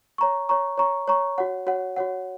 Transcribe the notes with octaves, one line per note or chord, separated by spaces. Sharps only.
C#5 A#5 C#6
C#5 A#5 C#6
C#5 A#5 C#6
C#5 A#5 C#6
F#4 C#5 F#5
F#4 C#5 F#5
F#4 C#5 F#5